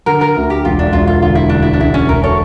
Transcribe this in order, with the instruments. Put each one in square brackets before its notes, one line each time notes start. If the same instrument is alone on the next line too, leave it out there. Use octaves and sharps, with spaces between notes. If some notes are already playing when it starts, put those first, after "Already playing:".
[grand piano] D3 [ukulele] A#4
[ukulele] A#4
[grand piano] D2
[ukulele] G4
[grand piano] E1 [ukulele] F4
[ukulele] D4
[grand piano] E1 [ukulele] F4
[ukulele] F4
[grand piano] D3 [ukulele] F4
[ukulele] E4
[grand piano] D2 [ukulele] D4
[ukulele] E4
D4
[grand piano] E1 [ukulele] E4
[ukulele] C#4
[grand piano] E1 [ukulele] A#4
[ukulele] A4 C#5